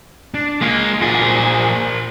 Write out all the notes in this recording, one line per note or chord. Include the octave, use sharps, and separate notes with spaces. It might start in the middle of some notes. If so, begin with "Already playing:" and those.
D4
G#3 A#3 F4
A#2 F4 F#4 G#4
A#4 C5